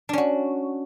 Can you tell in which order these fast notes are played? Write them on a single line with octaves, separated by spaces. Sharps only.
D4 C#4 F#4